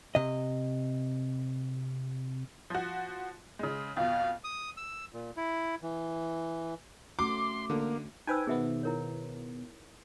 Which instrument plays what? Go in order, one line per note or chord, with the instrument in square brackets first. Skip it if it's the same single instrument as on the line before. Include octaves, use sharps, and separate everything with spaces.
[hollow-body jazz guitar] C3 D#5
[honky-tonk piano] F3 F#4
C#3 G#3
[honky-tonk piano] F2 B2 [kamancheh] F5
[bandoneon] D#6
E6
A#2
E4
E3
[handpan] A3 C#4 F#4 [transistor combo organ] C6 [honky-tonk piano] D6
[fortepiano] D3 [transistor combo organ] A#3
[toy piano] D#4 C5 E6 [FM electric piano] B4 G5 G#5
[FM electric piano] B2 D#3 B3 [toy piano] G#4 E5
[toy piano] E4 A#4 C#5